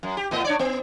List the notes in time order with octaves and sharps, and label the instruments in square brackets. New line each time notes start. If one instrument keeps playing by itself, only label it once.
[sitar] F#2
G4
A2 B3 D#5
D4 C#5 D5
B3